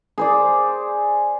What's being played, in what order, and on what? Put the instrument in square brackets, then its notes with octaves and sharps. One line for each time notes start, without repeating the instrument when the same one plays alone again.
[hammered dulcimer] G#4 C5 D5